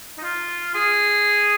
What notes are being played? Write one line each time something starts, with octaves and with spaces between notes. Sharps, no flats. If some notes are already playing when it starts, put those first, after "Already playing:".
D#4
F4
G#4